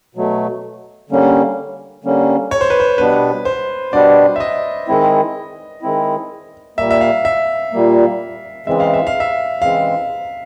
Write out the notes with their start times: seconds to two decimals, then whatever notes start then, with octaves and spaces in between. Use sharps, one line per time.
0.15 B2 F#3 A3
1.10 D3 G3 A#3 C#4
2.04 D3 G3 A#3 C#4
2.51 C#5
2.61 C5
2.70 B4
2.80 C5
2.98 B2 G3 B3 D4 B4
3.45 C5
3.93 B2 G3 B3 D4 D5
4.36 E5
4.40 D#5
4.88 D#3 G#3 C4 E4
5.83 D#3 G#3 C4 E4
6.77 A#2 G3 A#3 E5
6.91 E5
7.01 F5
7.25 E5
7.72 A#2 G3 A#3
8.66 C#3 E3 G#3 C4 E5
8.80 F5
8.94 E5
9.07 F5
9.20 E5
9.61 C#3 E3 G#3 C4 F5